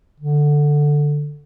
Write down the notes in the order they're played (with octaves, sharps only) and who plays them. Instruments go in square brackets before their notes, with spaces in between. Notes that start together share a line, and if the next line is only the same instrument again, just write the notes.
[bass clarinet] D3